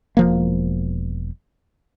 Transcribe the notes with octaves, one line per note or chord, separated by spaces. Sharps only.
E1 F3 A#3